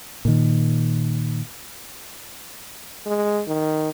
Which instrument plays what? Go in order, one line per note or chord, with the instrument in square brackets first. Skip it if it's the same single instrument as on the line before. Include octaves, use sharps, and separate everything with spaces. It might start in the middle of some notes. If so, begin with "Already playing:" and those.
[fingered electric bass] A#2 D#3
[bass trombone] G#3
D#3